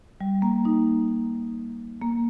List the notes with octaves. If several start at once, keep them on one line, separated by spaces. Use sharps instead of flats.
G3
A#3
D#4
A#3